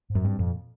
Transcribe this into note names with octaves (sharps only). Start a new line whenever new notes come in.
G#2
F#2
G2 C4
F2 A#2